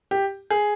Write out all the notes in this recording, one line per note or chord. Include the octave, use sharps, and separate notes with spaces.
G4
G#4